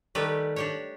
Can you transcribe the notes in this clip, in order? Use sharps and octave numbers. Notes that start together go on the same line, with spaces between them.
D#3 G3 A3 G4 B4
D4 G4 C#5